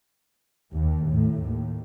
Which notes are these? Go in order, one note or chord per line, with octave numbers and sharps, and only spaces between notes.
D#2
A2
D#2